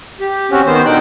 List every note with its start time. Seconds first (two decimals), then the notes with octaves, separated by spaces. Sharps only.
0.20 G4
0.51 C4 C#4 F#4
0.66 D#3 B3 C5
0.85 B2 D3 D#4 G5 F#6